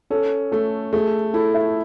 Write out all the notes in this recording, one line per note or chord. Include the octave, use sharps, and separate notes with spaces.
C#4 A4
A3 A4
A3 G#4
E4 A4
E5